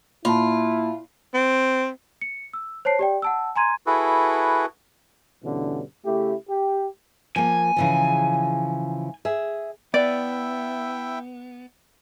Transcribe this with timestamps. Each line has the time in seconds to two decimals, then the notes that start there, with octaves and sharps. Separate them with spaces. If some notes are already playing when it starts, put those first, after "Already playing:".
0.25 A#2 E4 F4 A5 B5
1.34 C4
2.21 C#7
2.53 E6
2.85 C5 C#5 A5 C7
2.99 G4 D5 G5
3.22 F#5 A5 E6
3.56 G#5 A#5 C6 G#6 D#7
3.87 E4 F#4 G#4 A4 B4
5.43 G2 B2 D3 E3 C#4
6.05 C#3 A3 E4 G4
6.48 G4
7.36 F3 A#3 G#5
7.76 C#3 E3 F3
9.25 G#4 E5
9.94 B3 E4 D5 E5 G5